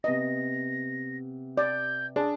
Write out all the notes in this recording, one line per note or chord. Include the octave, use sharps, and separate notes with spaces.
C3 B3 D#5 A#6
D5 G6
D4 G#4